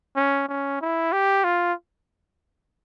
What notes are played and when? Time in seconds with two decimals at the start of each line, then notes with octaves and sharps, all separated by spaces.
0.16 C#4
0.49 C#4
0.81 E4
1.12 G4
1.44 F4